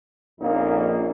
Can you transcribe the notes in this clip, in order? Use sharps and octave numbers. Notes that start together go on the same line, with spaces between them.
A#1 F2 A#3 C#4 D#4